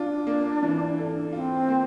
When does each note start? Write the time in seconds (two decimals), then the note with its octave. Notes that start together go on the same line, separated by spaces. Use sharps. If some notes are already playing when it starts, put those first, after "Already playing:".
Already playing: D4 F4
0.27 A#3
0.63 E3
0.98 A4
1.32 C4 F4
1.69 A#3